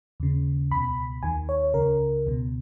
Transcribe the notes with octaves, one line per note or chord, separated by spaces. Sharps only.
D#2 C#3
C#2 B2 B5
D#2 D#3 G#5
C#5
C#2 C#3 A#4
C#2 B2